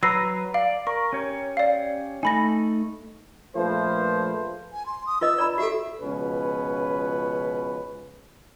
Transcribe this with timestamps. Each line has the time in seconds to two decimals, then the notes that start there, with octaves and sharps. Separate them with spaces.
0.03 F#3 B4 A#5 E6 A#6 C7
0.54 D5 F5
0.87 A#4 C#6
1.13 C#4 G4 C#5
1.57 D5 F5
2.23 A3 D#4 G#5 B5 A#6
3.55 A#1 F3 A3 B4 C5
4.73 G#5
4.86 C6
5.06 D#6
5.21 F4 B4 D#5 E6
5.38 D5 A#5 B5
5.58 F#4 G4 A4 E5
6.01 C#2 B2 F3 C#4 B4